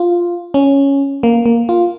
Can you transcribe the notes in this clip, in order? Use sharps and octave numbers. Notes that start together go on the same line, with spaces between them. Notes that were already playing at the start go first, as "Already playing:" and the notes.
Already playing: F4
C#4
A#3
A#3
F4